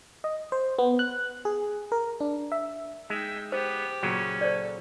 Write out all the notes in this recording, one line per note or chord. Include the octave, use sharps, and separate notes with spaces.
D#5
C5
B3
F#6
G#4
A#4
D4
E5
G#3 D#4 E5 G5
B3 G4 C5
A#2 C#3 F#3 C#4
A4 C5 D5